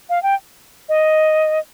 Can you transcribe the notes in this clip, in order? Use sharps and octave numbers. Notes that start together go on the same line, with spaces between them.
F5
G5
D#5